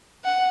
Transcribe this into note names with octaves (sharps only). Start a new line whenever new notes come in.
F#5